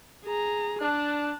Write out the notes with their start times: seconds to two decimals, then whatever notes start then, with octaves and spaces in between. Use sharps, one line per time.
0.25 G#4 A#5
0.81 D4 A5 F#6